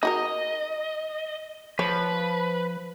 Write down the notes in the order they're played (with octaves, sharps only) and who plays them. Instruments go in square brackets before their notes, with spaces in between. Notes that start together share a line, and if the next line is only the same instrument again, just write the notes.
[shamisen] D#4 F#4 A#4 [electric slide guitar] D#5
[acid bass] F3 [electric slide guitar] B4 [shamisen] C#5